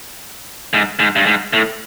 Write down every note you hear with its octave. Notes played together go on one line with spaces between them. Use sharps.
G#2
G#2
G2
G#2
A2